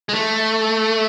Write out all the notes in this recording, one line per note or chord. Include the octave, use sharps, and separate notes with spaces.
G#3
A3